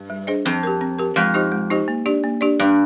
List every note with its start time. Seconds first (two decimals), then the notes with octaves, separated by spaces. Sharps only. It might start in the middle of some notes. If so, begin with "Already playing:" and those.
Already playing: G2
0.10 G3
0.27 D4 G#4 C5 D#5
0.45 F2 C4
0.63 G4 A#4
0.81 C4
0.99 G4 A#4
1.16 F2 G#3
1.34 D#4 G4 C5 D#5
1.52 G#3
1.70 D#4 G4 C5 D#5
1.88 A#3
2.06 D4 G4 D5
2.24 A#3
2.41 D4 G4 D5
2.60 G2 D4